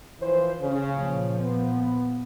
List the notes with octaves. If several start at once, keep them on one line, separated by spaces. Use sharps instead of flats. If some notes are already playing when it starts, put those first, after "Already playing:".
E3 F3 C5
C#3
A#2 F3
B3